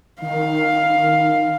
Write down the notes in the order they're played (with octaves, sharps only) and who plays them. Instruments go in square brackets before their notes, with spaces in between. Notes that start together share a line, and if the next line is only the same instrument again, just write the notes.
[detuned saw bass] D#3 [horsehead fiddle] F5